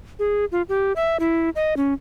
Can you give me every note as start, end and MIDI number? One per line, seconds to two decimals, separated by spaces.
0.19 0.45 68
0.52 0.62 65
0.69 0.93 67
0.96 1.17 76
1.20 1.50 64
1.55 1.77 75
1.77 1.93 61